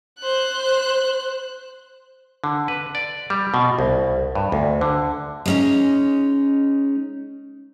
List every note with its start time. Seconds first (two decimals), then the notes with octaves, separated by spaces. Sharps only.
0.20 C5 F#6
2.44 D3
2.68 B4
2.95 D5
3.30 G3
3.54 B2
3.79 C2
4.35 G2
4.52 D2
4.81 D3
5.46 G#3 C#4 D#4